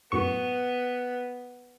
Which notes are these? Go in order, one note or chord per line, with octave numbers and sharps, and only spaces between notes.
F#2 A2 B3 C#6